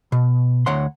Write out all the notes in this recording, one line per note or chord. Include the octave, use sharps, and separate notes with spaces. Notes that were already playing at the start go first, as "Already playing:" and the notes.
B2
D2 C#5 F#5 C6